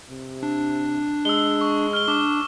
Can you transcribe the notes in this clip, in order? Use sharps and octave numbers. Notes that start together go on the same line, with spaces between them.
C3
D4
G#3 E6 G7
C#6
F6 G7
D4 D6